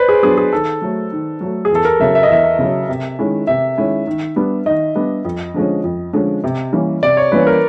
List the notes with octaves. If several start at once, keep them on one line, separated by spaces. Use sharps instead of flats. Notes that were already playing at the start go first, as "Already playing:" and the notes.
Already playing: B4 C5 D5
G#4
F#3 B3 D4 G#4
G#4
D#3 A4
F#3 A3
D#3
F#3 A3
G#4
E2 A4
A#4
C#3 F#3 E5
E5
D#5
E2 E5
C#3 F#3
C3
D#3 G#3 C#4 E4
C3 E5
D#3 G#3 C#4 E4
D#3
G3 B3 D4
D#3 D#5
G3 B3 D4
F2
D3 F3 G#3 C#4
F2
D3 F3 G#3 C#4
C3
E3 G3 A#3 C#4
C3 D5
C#5
E3 G3 A#3 C#4 B4
A#4